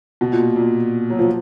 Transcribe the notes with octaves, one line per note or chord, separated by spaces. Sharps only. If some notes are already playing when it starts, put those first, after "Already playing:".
B2
A#2
A#2
F#3
F3